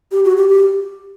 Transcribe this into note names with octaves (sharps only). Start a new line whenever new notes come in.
G4
F#4
G4
G4